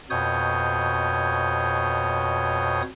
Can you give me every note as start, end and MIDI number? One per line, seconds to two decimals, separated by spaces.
0.10 2.82 41
0.10 2.82 47
0.10 2.82 73
0.10 2.82 87
0.10 2.82 91